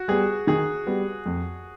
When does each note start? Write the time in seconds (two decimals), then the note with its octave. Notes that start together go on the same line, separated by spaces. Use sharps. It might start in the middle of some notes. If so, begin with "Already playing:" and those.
Already playing: F#4
0.08 G3 B3 G#4
0.47 D#3 G#4
0.87 G3 B3
1.26 F2